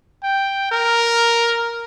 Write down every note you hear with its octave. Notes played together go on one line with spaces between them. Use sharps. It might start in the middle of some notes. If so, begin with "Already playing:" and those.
G5
A#4